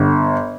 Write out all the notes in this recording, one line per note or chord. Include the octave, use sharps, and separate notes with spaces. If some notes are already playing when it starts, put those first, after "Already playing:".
Already playing: G1